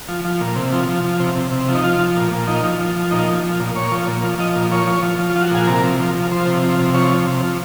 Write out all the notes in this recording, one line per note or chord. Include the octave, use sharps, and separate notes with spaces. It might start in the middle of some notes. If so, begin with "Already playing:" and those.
F3
F3
A#2
C3
F3
F3
F3
C3
C3
C3
F3
D#4
F3 F4
F3
A#2
A#2
F3 D#4
F3
F3
F3
A#2 D#4
F3
F3
A#2
A#2 C#5
F3
A#2
F3
F3 D#5
A#2
F3 C#5
F3
F3
F3
F4
F3
F#4
A#2 G#4
C3 A#4
F3
F3
F3
F3 C5
C3
F3
C3
F3 C#5
F3
C3
F3